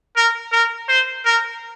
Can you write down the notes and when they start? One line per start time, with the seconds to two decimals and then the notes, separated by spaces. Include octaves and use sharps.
0.17 A#4
0.52 A#4
0.89 C5
1.25 A#4